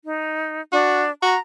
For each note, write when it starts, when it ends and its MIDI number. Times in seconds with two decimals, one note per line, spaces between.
0.05 0.61 63
0.73 1.11 62
0.73 1.04 66
1.23 1.36 66
1.23 1.39 82